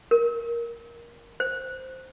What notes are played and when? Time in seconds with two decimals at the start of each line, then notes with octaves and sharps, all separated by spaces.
0.11 A#4
1.40 C5